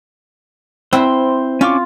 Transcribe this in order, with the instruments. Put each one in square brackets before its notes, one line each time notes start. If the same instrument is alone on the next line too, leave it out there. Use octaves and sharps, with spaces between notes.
[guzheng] C4 E4 B4 [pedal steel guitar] C5
[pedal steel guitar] C#4 C#6 D6 [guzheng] F4